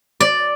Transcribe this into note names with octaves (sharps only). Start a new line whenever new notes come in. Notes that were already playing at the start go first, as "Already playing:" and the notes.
D5